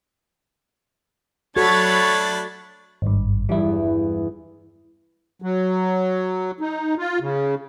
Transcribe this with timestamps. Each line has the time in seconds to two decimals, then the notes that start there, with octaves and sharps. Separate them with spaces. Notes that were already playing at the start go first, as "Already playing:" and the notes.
1.56 F#3 A3 D4 F#4 A4 C#5 B5 A6
3.02 G#1 G2
3.49 E2 G2 E3 G3 E4
5.42 F#3
6.60 D#4
6.98 F4
7.20 C#3